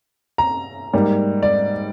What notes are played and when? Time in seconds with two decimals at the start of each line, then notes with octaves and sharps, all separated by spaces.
0.38 A#5
0.93 G#2 G3 A#3
1.43 D5